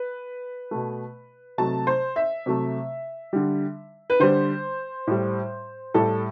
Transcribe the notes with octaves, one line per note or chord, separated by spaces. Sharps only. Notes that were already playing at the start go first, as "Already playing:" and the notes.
Already playing: B4
B2 A3
C3 F#3 A3 A5
C5
E5
C3 F#3 A3
D3 G3
B4
D3 G3 C5
A2 G3
A2 G3 A4